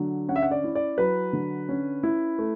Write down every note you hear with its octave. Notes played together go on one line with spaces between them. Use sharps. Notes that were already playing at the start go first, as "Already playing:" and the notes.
Already playing: D3 F#3
C#4 F#5
E5
F#5
D5
E4
D5
F#3 B4
D3
C#4
E4
A3